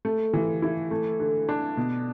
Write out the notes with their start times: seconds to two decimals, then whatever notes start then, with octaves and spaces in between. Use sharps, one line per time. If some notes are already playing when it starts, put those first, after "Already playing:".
0.05 A3
0.33 E3
0.62 E4
0.91 A3
1.20 D3
1.49 D4
1.77 B2